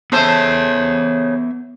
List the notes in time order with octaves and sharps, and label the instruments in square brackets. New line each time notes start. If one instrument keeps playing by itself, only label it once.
[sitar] C#3 A4 C5 [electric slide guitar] B3 E5